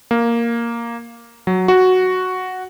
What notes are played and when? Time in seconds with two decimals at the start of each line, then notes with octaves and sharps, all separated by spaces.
0.11 A#3
1.47 F#3
1.68 F#4